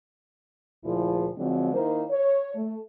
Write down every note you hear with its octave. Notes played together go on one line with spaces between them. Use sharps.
D2 A#2 F3 E4 G#4
D3 F3 F#3 G#3 C4
D#3 A#3 E4 A#4 C5
C#5
A3